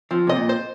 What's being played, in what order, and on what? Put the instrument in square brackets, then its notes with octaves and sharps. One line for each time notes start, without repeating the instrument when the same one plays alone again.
[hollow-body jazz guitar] F3 [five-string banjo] C4
[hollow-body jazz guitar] C3 [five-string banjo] D#5
[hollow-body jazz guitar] A#2
[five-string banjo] C5